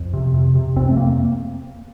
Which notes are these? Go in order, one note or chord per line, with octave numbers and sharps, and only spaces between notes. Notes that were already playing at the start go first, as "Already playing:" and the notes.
Already playing: F2
C3
C3
C3
F2 C4
A3
A#3